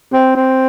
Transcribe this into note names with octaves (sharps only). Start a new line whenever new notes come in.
C4
C4